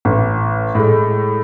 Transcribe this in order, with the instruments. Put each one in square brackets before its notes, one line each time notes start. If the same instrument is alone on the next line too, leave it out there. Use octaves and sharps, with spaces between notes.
[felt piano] A1
A2 G#3